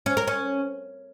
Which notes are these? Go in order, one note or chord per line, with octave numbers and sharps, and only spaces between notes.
C#4
A#4
C#4